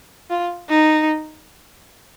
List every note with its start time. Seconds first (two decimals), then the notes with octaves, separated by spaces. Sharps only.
0.30 F4
0.70 D#4